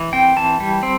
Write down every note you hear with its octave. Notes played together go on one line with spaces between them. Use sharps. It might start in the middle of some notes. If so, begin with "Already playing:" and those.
Already playing: E3
C4 G5
E3 A5
G3
C4